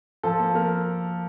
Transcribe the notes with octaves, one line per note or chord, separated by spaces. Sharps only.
F3 A4
A#3
A#3 A#4